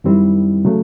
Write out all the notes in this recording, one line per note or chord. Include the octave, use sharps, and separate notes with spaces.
F#2 D#3 G3 C4 E4
C#3 F#3 A3